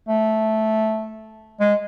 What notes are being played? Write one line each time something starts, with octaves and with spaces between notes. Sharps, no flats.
A3
G#3